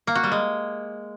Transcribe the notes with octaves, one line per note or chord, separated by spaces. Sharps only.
A#3
F#4
G3
G#3